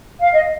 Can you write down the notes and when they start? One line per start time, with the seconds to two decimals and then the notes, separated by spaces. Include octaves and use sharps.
0.21 F5
0.33 D#5